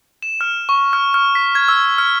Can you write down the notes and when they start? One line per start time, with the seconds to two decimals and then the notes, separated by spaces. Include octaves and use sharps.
0.22 E7
0.41 F6
0.69 C#6
0.93 F6
1.14 F6
1.35 B6
1.55 G#6
1.68 E6
1.98 F6